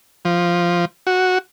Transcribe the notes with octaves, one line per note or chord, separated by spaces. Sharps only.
F3
F#4